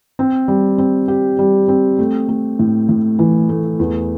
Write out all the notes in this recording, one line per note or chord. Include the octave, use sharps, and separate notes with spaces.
C4
G3
C4
G4
G3
C4
A3
A3
A2
A2
E3
A3
E2